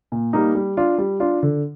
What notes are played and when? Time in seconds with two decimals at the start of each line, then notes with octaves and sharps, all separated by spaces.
0.12 A#2
0.33 G3 A#3 D#4
0.55 G3
0.77 D4 F4
0.98 G3
1.20 D4 F4
1.43 D3